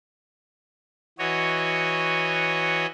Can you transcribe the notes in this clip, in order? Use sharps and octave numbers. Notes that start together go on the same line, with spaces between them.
E3 F#4 C#5 D#5